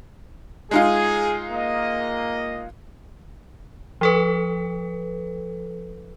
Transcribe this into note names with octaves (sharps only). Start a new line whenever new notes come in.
G#3 D#4 F4 G#4
A#3 D#5
F3 A4 B4